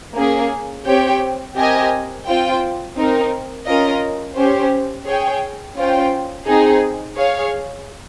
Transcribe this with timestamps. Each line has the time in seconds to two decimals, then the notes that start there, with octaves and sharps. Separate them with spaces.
0.15 A#3 C#4 G#4
0.85 C4 G4 C#5 G5
1.55 C4 G4 A#4 D#5 G#5
2.25 C4 F4 C5 G5
2.96 C4 D#4 A#4
3.65 C#4 F4 A#4 D#5
4.36 C#4 G4 C5
5.05 G#4 C#5 G5
5.76 C#4 F4 C5 G5
6.45 C4 D#4 G#4
7.15 G#4 C#5 F5